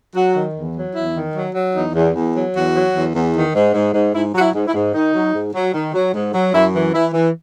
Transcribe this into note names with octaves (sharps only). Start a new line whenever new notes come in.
F#3 F#4
D#3
E2
F#3
E2 E4
D#3
F#3
F#3
E2 D#4
E2
E2
F#3
E2 F#4
F#3
E2
E2
D#3
G#2
G#2
G#2
G#2 E4
F#3 F#4
E4
G#2
E4
G#2
D#3 D#4
F#3
G#2
F#3
D#3
F#3
G#2
F#3
F#2 E4
E3
E3 E4
E3